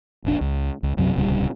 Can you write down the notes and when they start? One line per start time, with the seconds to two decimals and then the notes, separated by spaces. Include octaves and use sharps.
0.25 F1 A#1 D4
0.41 C#2
0.83 C#2
0.97 B1 F#2 C3 F#3
1.16 D1 C2 C#3 G3